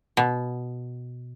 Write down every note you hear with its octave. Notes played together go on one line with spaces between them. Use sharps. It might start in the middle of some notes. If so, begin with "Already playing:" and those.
B2